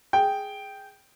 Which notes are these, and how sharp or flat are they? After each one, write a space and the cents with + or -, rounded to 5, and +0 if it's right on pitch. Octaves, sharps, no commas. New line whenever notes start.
G#4 +0 G5 +0